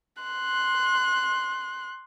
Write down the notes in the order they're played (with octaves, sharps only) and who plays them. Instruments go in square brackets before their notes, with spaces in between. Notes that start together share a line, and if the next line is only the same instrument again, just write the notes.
[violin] C6 F#6